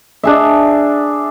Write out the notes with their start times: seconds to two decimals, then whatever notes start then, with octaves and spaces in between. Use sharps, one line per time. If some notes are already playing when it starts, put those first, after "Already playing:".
0.23 D4 G#4 E5